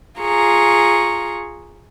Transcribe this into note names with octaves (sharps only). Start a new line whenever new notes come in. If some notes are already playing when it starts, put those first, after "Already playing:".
F4 G#4 A#5 C#6